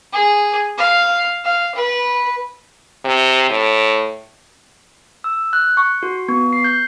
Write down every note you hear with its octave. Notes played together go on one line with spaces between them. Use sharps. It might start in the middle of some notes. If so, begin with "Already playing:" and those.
G#4
F5
F5
B4
C3
A2
E6
F#6
C#6
F#4
B3
C7
G6